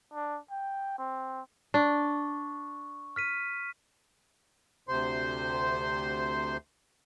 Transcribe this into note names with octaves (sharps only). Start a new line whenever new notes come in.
D4
G5
C4
D4 C#6
F6 B6 D#7
D2 C3 C5 C6